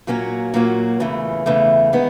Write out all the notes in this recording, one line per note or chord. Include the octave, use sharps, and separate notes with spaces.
A#2 F#3 A#3 C#4 F#4
A#2 F#3 A#3 C#4 F#4
E2 C#3 E3 A3
E2 C#3 E3 A3
D#3 G#3 B3